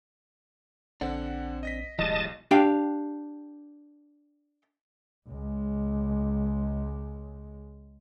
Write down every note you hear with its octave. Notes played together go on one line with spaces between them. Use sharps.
A#1 D3 C4 D4 F#5
D#5 A#6 B6
D1 B1 E3 G3 G#3 D#5 A5
D4 G4 F5 G5
C#2 G#3